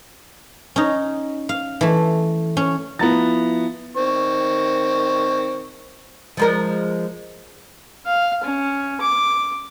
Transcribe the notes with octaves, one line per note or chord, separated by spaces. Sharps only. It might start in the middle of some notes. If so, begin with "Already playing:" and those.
C#4 D#4
F5
E3 A3
C#4
F3 B3 E4 F#5 A#5 A6
D#3 C4 C#6
F3 G#3 A#4
F5
C#4
D6